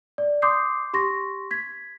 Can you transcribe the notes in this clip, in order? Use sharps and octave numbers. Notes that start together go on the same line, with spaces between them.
D5
C6 D6 D#6 G6 C7
G4 C6 C#6 A#6
G#6 B6